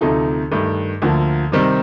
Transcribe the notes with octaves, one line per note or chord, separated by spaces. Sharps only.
D2 C3 F3 A3 D#4
G2 D#3 A3
D2 D3 F3 A#3
C3 D#3 G3 C4 D#4